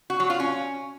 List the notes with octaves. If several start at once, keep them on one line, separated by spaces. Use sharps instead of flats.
F#4
F#3
F4
C#4